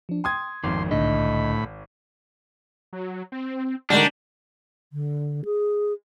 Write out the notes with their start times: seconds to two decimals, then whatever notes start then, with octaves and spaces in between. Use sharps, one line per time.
0.09 F3 D4
0.24 G5 C6 D#6 G#6
0.64 G#1 F2 D#3 C6 D6
0.91 C2 A2 D3 D4 D#5 B5
2.93 F#3
3.32 C4
3.90 D3 D#3 G3 G#3 D4 F#4
4.93 D3
5.45 G#4